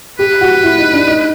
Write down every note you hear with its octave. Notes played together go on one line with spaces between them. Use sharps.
G4 B4
F#4
E4
D#4
D4
D#4